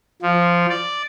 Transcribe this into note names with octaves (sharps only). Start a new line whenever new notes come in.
F3
D5